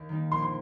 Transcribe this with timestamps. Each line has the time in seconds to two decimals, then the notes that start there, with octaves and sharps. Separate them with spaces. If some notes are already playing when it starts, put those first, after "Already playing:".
Already playing: D#2
0.09 D#3 G3 A#3 D#4
0.32 A#1 C6
0.42 C6